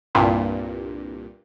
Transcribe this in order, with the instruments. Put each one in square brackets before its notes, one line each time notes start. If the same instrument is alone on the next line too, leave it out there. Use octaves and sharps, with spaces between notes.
[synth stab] C2 G2 A#2